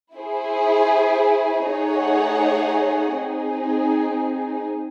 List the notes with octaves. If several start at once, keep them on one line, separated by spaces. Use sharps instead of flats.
E4 G#4 C5
A3 D#4 G#4 C#5 F#5
C4 D#4 G#4